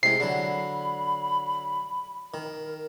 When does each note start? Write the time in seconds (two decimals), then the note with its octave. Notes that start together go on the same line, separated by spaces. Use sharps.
0.03 C3 G#3 E4 C7
0.20 D3 F#3 B5
2.34 D#3 A#4